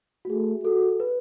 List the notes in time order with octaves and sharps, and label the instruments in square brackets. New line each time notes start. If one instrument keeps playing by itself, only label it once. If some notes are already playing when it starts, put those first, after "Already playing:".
[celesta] F#4
[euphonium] A3 [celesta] G#4
[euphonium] F#4 [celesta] A4
[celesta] B4